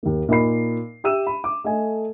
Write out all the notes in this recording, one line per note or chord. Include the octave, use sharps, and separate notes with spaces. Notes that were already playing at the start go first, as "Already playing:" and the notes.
D#2 A#3
A#2 D#4 A#4 D#5 B5 C7
G4 E5 E6 D#7 E7
B5
D6
A3 A4 D#5 G#5